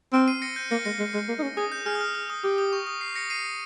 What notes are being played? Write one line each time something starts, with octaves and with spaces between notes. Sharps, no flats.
C4 F6
C7 D#7
A#6 C#7
G6
A#3 A#6 C#7
G#3 A#6 C#7
G#3
G#3
A#3
D#4
C#4
G#4 D#6
G6
G#4 F6
D#6
F6
F6
D#6
G4 D#6
D#6
C#6
D#6
C7
A#6 C#7
C7 D#7